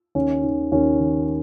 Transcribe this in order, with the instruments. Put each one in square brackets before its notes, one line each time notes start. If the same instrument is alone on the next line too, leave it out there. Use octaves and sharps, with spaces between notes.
[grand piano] D#2 C#4
D#3
D#2 C#4
D#3